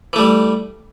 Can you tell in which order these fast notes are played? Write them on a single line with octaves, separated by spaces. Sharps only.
E3 A3 G3